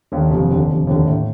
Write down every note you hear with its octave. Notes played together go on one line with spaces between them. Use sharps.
D#2 D3
F1
D#2 D3
F1
D#2 D3
A2